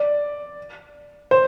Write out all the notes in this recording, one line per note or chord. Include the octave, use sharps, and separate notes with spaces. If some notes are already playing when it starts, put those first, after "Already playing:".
Already playing: D5
C5